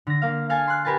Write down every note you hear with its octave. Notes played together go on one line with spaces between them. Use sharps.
D3 A#6
A#3 F5
A4 F5 G#5 A5
C6 F#6
G4 A#4 B4 G#5 A5